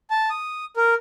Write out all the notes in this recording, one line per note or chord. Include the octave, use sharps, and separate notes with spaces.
A5
D#6
A#4